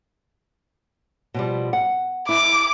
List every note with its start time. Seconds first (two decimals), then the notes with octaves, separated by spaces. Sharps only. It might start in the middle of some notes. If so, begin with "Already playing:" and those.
1.34 B2 F3 G3
1.73 F#5
2.29 E4 D6